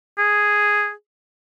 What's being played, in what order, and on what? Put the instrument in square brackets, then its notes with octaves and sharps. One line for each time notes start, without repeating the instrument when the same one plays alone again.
[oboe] G#4